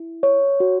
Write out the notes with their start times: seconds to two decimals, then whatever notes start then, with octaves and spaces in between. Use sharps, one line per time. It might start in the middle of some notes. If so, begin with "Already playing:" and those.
Already playing: E4
0.23 C#5
0.60 F#4